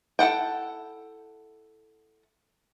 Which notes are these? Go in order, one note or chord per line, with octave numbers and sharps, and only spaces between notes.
E4 A4 F#5 G5